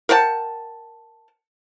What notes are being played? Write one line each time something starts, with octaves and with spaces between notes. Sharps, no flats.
A#4 F#5 G5 A5